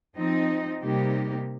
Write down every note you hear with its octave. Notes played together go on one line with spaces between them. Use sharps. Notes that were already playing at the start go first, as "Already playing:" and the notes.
F3 C4 D#4
C3 G3 A#3 D#4 G4